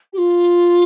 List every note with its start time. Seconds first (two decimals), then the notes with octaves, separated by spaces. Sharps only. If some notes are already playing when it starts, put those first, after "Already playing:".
0.12 G4
0.17 F4